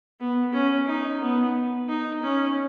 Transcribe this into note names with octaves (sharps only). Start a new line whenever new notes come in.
B3
C#4
D#4
B3
D#4
C#4